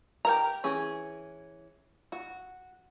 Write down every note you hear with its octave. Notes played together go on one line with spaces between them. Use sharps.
G4 A#4 A#5
E3 C#4 G#4
F#4